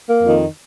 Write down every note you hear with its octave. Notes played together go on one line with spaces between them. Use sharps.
A#3
F2 D#3